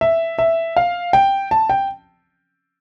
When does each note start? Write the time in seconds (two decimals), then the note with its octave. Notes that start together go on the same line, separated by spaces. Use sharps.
0.01 E5
0.39 E5
0.76 F5
1.13 G5
1.51 A5
1.70 G5